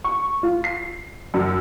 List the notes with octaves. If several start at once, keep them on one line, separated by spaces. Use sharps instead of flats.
C#6
F4
C7
F#2